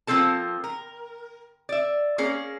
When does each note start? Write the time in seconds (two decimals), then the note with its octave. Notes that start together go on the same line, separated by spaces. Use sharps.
0.07 F3 A#3 C4 A4 A5
0.64 A#4
1.69 D5 E5
2.18 A#3 C#4 G#4